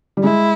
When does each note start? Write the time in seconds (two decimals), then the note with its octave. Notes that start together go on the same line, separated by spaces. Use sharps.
0.17 G3
0.23 G#3 E4